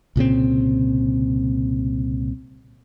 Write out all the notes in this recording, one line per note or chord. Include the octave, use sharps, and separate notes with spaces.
C2 A#2 C#3 C4